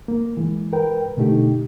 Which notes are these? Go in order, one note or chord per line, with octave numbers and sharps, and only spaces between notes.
A#3
E3 G#3
A#4 B4 G5
B2 D3 A3 D#4 G4